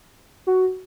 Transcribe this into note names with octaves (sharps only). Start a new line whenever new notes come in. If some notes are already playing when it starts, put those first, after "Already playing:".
F#4